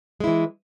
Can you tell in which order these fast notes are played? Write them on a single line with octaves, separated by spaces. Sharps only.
G#3 E4 E3